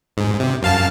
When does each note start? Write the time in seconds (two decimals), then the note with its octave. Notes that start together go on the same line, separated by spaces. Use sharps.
0.17 G#2
0.40 C3
0.63 F#2 F5 A5